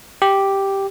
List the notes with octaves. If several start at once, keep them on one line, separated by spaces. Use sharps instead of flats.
G4